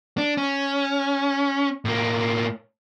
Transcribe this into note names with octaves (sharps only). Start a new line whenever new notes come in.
D4
C#4
A2 A#3